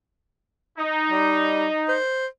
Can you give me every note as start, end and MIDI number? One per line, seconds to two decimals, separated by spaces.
0.79 1.95 63
1.10 1.66 55
1.88 2.26 72